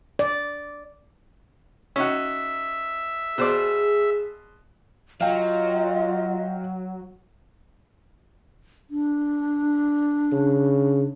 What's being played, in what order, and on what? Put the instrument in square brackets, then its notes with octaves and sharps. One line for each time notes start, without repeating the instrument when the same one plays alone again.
[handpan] D5
[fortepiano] C#4 D#4 F#4 [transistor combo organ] E5
[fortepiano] B2 C5 D5 [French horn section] G#4
[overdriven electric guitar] F#3 [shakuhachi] F4 [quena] D#5 [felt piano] F5 G5
[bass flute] D4
[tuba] C#3